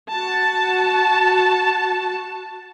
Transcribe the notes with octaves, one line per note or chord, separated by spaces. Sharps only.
F#4 A5